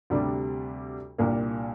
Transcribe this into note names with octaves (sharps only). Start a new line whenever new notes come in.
D2 C3 G3 D4
C2 A#2 A#3 D4